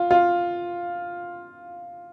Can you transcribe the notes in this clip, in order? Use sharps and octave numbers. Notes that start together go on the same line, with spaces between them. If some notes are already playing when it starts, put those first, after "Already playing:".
Already playing: F4
F4